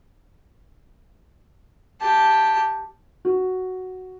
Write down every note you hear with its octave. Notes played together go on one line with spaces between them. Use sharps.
G4 A5
F#4